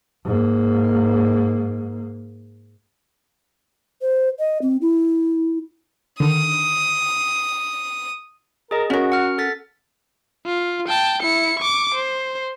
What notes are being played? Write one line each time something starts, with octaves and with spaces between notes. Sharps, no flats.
G#2 A#3
C5
D#5
C4
E4
D3 D#3 D#6
G#4 A#4 D#5
C#4 F#4 A#4
F#5 F6
A4 A6 B6
F4
G5 A5
E4 C#7
C#6 D6
C5